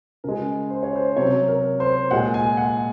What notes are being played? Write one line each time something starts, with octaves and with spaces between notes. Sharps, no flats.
C#3 G#3 A#4
C5
C#5
C5
C3 F#3 C#5
A#4
C5
A#2 G#3 F#5
G#5
F#5